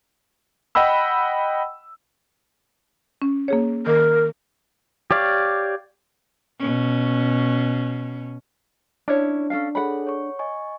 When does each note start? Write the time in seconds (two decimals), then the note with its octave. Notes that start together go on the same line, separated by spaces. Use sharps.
0.75 D#5 F#5 G5 B5 E6
3.22 C#4
3.48 A#3 G#4 C#5
3.87 D#3 A#4
5.11 G4 C#5 D5 F5
6.60 B2 C#4
9.08 C#4 D4 E4 C#5
9.50 C#4 A4 F5
9.75 G#4 A4 C#5 F#5 B5
10.07 C#5 C#6
10.39 D#5 G#5 C#6